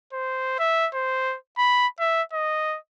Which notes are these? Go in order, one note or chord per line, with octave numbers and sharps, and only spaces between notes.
C5
E5
C5
B5
E5
D#5